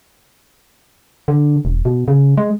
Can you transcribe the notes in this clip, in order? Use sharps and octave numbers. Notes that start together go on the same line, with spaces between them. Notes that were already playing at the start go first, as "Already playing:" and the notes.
D3
E1
B2
C#3
G#3